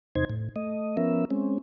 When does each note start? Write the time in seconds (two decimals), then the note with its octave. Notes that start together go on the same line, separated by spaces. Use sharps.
0.15 E2 C3 D#4 C5 G#6
0.30 A2
0.56 A3 D#5
0.97 F3 B3 C#4 A#4 E5
1.31 G#3 C4 C#4